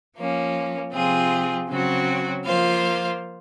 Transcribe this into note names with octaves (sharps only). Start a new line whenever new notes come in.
F3 A#3 C#4
C3 F3 C4 F4 G#4
C#3 F#3 C4 F#4
F3 A#3 F4 C5 F5